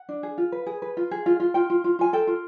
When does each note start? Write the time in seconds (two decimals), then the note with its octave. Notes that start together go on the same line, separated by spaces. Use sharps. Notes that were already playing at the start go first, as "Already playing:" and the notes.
Already playing: F#5
0.09 D4
0.23 G#4
0.38 F4
0.52 B4
0.66 G#4
0.82 B4
0.97 F4
1.11 G#4
1.26 F4
1.40 F4
1.54 F4 G5
1.70 F4
1.84 F4
1.99 F4 G#5
2.13 A4 G5
2.27 F4